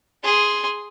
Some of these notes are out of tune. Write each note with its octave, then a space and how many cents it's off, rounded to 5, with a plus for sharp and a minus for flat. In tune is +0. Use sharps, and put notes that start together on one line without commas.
G#4 +0 C6 +0